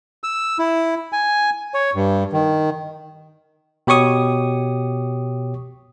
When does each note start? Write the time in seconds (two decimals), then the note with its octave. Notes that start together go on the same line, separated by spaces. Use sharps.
0.24 E6
0.59 E4
1.13 G#5
1.74 C#5
1.95 G2
2.33 D#3
3.87 B2 G4 C#5 C#6 D#6